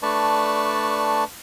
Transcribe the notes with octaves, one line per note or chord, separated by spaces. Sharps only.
A3 D4 B4 D5 A5 C#6